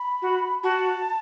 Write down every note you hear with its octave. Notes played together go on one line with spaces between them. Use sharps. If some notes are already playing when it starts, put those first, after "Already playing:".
Already playing: B5
F#4
F#4 A5